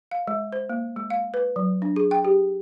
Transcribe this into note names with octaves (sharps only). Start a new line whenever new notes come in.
F5
G#3
C5
A#3
G#3
F5
B4
F#3
D4
G#4
G5
G4